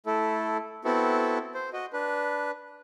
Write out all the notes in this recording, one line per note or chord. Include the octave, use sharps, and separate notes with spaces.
A3 E4 A4
B3 C4 E4 F#4 A4
C5
F#4 D#5
D4 B4